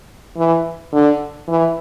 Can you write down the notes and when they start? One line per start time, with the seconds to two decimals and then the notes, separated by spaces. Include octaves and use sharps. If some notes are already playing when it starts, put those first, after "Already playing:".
0.37 E3
0.92 D3
1.48 E3